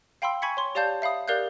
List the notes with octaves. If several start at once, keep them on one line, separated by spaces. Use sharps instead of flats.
F5 G5 B5 C6 E6
G#5 B5 C#6 G#6 B6 C#7
C#5 C6
G4 C#5 D5 F5 A5 G6
E5 F5 B5 D#6
G4 A#4 D5 F5 F#6 G6